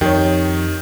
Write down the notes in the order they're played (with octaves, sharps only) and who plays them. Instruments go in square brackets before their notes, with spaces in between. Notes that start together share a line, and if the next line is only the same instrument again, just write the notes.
[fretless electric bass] F2 [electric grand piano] D#3 [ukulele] G4 C#5